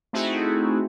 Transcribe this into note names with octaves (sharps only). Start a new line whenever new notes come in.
A3 C4 D#4 E4 F#4 G#4